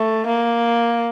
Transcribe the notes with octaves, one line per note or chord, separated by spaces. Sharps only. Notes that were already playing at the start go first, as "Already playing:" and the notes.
Already playing: A3
A#3